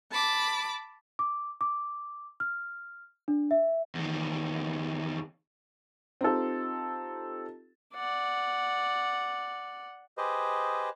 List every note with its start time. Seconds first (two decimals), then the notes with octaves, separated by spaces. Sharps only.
0.10 A5 B5 D6
1.19 D6
1.61 D6
2.40 F6
3.28 D4
3.51 E5
3.95 E2 D#3
6.21 C4 D#4 F4 G4 A4
7.95 D5 F#5
10.18 G4 G#4 B4 C5 D#5